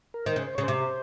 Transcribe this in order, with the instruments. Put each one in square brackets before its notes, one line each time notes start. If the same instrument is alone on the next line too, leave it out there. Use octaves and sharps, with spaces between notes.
[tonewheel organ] A#4
[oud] D#3 [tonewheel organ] C5
[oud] C#3
[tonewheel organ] C5
[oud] C#3 [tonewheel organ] C#5
[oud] C3 [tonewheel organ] C5